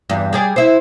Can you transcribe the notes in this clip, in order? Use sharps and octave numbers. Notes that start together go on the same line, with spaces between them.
E2 G2
G3 G#4 D5
E4 C5